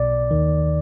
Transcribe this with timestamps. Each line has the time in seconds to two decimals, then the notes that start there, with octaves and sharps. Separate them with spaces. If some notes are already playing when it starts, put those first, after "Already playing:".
Already playing: B1 B2 D5
0.31 D#2 D#3